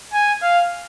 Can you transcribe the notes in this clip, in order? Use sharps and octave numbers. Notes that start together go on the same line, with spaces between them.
G#5
F5